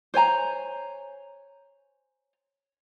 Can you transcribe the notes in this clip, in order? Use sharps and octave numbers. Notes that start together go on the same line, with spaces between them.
C5 C#5 G#5 A#5